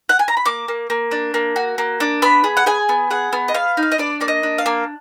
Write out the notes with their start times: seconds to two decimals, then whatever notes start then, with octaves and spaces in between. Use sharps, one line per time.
0.09 F#5
0.19 G#5
0.28 A#5
0.37 B5
0.46 A#3 D6
0.68 A#3
0.90 A#3
1.11 D4
1.34 A#3
1.56 F#4
1.78 A#3
2.00 D4
2.22 B3 B5
2.44 G#4
2.57 F#5
2.66 G#4 G#5
2.89 B3
3.10 G#4 F#5
3.33 B3
3.48 D#5
3.54 B3 F5
3.77 D#4
3.83 F5
3.92 D#5
3.98 D4 D5
4.21 A#3 D5
4.28 D#5
4.43 D4
4.58 F5
4.66 A#3